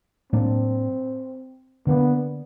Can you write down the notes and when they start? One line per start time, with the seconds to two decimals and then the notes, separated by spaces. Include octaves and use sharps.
0.32 A2 F#3 A#3 C4 D4
1.87 D3 F#3 A#3 B3 D4